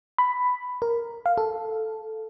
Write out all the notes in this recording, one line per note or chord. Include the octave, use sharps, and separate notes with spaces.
B5
A#4
F5
A4